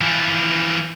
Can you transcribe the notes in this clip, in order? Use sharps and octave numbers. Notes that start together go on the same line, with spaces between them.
E3 F3